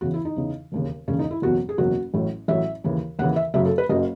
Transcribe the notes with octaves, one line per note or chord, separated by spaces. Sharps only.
E2 C#3 E3 F#4
E4
D#4
E2 C#3 E3
E1 D#2 C#3
E1 D#2 C#3 C#4
D#4
E4
F#1 E2 B2 F#3 F#4
G#4
F#1 E2 B2 F#3 F#4
A1 A2 F#3
A1 A2 F#3 E5
D#2 C#3 E3
D#2 C#3 E3 F#5
E5
F#1 F#2 C#3 F#3 E5
A4
B4
F#1 F#2 C#3 F#3 D#5